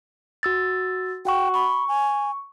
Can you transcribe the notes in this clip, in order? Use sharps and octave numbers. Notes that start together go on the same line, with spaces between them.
F#4 E6 A6
F#4 F#5 G5 C#6
B5 C#6
G#5